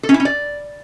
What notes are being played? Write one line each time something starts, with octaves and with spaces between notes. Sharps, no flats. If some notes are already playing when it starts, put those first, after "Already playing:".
A4
C#4
E4
C#4
D5